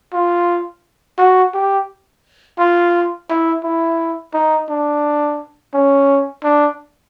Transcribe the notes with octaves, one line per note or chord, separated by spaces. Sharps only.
F4
F#4
G4
F4
E4
E4
D#4
D4
C#4
D4